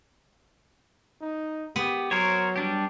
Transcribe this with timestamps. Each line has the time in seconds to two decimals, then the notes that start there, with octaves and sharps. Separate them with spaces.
1.21 D#4
1.76 B3 G4
2.11 F#3 A#4 C5 C#5
2.56 G3 D4 G4